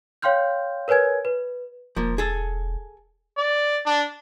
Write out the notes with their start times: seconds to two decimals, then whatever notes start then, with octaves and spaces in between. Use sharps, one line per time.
0.22 C#5 F5 G5 C6 F6 G6
0.88 A#4 B4 C#5 G#5 G#6
1.25 B4
1.96 E1 F3 A#3
2.18 G#4 A4
3.37 D5
3.86 D4